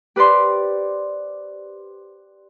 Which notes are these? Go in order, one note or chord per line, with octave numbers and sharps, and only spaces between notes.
G4 B4 C5 D5 C6